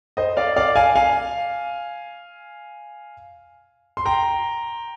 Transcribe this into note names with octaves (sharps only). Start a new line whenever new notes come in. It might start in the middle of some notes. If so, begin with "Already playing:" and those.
C5 D#5
D5 F5
D5 F5
F5 G#5
F5 G#5
C6
G5 A#5